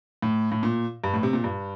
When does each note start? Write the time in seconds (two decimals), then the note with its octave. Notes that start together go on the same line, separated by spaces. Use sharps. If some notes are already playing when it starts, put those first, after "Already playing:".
0.22 A2
0.52 A2
0.63 A#2
1.04 G2
1.14 A2
1.23 C3
1.33 A#2
1.44 G2